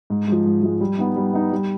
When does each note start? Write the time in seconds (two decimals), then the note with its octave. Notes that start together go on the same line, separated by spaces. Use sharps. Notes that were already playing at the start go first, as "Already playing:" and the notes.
0.10 G#2
0.28 F3 G#3
0.46 G#2
0.63 F3 G#3
0.81 G3
0.98 B3 D#4
1.16 G3
1.34 B3 D#4
1.52 G3